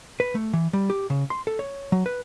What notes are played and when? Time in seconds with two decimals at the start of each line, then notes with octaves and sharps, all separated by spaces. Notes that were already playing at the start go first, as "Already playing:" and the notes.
0.20 B4
0.35 A3
0.53 E3
0.73 G3
0.90 G4
1.10 C#3
1.30 C6
1.47 A4
1.59 C#5
1.92 F#3
2.06 B4